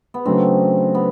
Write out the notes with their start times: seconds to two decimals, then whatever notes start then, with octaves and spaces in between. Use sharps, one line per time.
0.14 B3
0.26 C#3 F#3 A3 C4 D4
0.95 B3